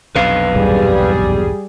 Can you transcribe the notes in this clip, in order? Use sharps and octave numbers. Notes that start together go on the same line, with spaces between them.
B1 F2 C3 B4 F5
A#1 E2 G2 G3 G#4